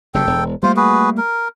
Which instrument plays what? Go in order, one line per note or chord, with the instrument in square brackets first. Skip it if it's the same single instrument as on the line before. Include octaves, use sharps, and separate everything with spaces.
[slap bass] F#1 F#2 C3 [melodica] A4 G5
[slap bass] E1
[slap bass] G3 A3 A#3 [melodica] F4 C5
[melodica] F#4 G#4 B4
A#4